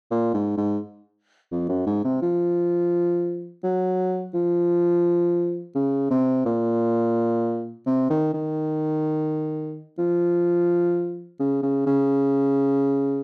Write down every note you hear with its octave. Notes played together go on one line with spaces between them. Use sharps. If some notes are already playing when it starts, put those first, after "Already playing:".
A#2
G#2
G#2
F2
F#2
G#2
C3
F3
F#3
F3
C#3
C3
A#2
C3
D#3
D#3
F3
C#3
C#3
C#3